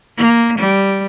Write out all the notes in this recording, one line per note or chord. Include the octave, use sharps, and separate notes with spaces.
A#3
G3